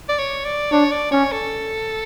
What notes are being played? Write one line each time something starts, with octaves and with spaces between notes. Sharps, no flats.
D5
C#5
D5
D4 C#5
D5
C#4 C#5
A4